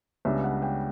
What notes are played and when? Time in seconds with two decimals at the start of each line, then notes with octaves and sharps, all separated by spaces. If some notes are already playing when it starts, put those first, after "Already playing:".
0.25 C#2 C#3 G3 B3 D4 E5
0.44 F#5
0.62 G5